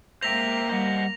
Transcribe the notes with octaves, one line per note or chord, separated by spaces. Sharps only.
G#3 A#3 A#4 C5 E5 G5 A#6 F7
G3 C5 D#5 F#5